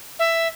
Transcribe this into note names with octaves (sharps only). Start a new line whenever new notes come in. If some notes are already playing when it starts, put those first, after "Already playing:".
E5